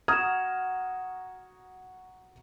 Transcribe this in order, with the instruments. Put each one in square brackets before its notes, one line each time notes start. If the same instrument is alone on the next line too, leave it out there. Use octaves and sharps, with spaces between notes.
[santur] F#4 [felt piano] A#5 D#6 F6 [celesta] G#6 E7